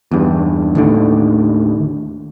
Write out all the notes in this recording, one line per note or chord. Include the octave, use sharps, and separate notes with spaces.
E2 G2
D#2 A2 D3